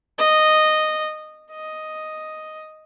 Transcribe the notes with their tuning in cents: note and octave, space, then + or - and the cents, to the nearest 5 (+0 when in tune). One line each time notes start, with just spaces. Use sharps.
D#5 -10
D#5 +0